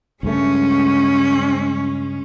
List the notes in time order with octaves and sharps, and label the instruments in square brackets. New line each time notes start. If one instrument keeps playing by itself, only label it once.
[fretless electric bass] C#2 G2 A3 [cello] G#3 C#4